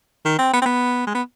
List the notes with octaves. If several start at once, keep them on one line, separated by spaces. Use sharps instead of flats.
D#3
C4
B3
C4
B3
G#3
B3